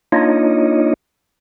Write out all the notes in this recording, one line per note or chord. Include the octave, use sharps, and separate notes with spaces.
A#3 D4 D#4 F4 C#5 D#5